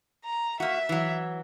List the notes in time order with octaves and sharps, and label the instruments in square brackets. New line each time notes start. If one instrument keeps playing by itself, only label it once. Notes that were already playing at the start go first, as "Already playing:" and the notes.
[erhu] A#5
[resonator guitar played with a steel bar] A#3 F#4 [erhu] E5
[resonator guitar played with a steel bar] E3 F#3